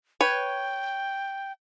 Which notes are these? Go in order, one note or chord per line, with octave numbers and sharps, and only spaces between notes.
B4 C#5 G5